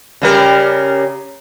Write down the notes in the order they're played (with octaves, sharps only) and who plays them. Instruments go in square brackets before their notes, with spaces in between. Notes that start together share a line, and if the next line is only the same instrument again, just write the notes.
[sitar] C#3 G3 A#4